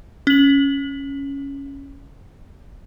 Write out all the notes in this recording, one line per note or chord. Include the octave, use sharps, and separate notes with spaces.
C#4 F#7